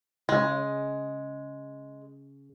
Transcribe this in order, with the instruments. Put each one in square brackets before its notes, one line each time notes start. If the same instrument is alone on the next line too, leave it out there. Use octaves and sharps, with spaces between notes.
[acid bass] C#3 [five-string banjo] G#3